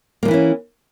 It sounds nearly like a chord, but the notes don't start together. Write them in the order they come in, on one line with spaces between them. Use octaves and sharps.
A#3 F3 E3 E4 C#4